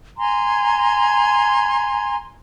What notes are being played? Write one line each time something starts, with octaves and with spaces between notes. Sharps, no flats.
G#5 A#5 C6